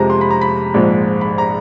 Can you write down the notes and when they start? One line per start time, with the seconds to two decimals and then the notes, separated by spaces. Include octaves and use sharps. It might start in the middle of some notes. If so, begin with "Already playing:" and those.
Already playing: F2 C3 F3 G#3 A#5
0.10 C6
0.21 B5
0.31 A#5
0.42 B5
0.74 A#1 G#2 F3 G#3
1.21 B5
1.38 A#5